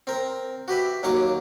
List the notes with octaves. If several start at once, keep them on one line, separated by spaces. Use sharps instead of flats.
C4 A#4
F#4 G4 B4 E5
D#2 F#3 A#3 F5 C#6 D6